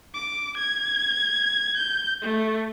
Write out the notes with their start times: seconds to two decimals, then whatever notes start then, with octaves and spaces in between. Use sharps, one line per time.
0.14 D6
0.57 G#6
1.77 G6
2.22 A3